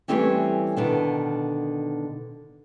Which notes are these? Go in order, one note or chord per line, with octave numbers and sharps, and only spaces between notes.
E3 F#3 G3 A3 C4 C#4
B2 D3 D#3